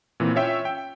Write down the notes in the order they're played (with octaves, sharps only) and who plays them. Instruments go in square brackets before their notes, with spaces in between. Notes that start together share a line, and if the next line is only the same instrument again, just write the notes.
[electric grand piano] A#2 E3 C4
C#4 F4 C#5 E5 G5
G5